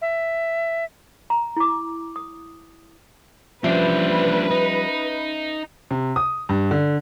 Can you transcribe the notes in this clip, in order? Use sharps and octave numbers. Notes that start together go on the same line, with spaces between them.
E5
A#5
E4 D6
D#6
F3 G3 C#4 D4 B4 C5 E5
D#4
C3
D#6
G2
D3